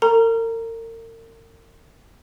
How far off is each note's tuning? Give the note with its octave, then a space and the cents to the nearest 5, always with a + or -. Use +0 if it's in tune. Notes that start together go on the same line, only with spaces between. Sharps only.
A#4 -40 A#5 +0